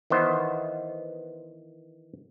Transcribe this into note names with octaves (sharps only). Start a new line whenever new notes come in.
D#3 E3 B3 C5